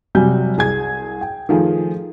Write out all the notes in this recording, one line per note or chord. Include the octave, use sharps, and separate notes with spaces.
C3 F#3 G3 F#4 G#5 G6
C2 G#4 G#6
G5
D#3 F3 A3 G#4